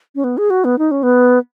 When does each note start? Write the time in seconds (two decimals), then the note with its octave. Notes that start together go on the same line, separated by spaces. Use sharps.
0.15 C#4
0.24 B3
0.38 G#4
0.50 F#4
0.64 B3
0.78 D#4
0.91 C#4
1.03 B3